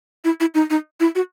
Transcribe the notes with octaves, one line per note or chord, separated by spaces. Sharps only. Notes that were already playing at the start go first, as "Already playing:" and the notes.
E4
E4
D#4
D#4
E4
F#4